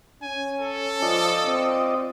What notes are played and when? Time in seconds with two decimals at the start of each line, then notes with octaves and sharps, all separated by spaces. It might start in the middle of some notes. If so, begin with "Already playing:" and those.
0.22 C#4 G#5
0.59 A4
1.02 F3 F4 D5 D#5
1.45 C4